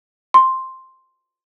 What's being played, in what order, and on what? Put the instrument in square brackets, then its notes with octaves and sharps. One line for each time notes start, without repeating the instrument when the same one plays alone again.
[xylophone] C6